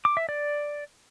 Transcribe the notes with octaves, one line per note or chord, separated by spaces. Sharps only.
D6
E5
D5